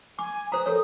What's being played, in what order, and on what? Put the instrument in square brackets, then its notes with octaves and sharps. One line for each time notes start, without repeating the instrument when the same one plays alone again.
[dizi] G#5 [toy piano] D6
[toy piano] C5 A#5 [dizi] D#6
[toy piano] A4 A#4 C#5